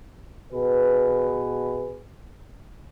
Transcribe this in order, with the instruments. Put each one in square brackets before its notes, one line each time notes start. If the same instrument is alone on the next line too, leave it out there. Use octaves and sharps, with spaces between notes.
[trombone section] B2 G#4 B4